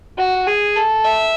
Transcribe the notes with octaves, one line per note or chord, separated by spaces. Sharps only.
F#4
G#4
A4
E5